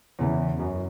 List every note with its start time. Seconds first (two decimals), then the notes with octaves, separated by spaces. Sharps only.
0.19 E2 C#3 E3
0.59 F#2